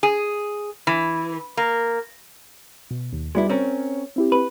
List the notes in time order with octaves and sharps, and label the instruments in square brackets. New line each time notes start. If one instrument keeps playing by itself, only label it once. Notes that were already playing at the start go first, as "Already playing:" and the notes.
[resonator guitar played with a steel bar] G#4
E3
A#3
[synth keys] B2
D#2
[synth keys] G3 F#4 D5 [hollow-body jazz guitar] G#3 B3 E4
[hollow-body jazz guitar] C4 C#4 A#4 [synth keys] C#5
[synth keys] C4 E4 G4
[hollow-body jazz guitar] B4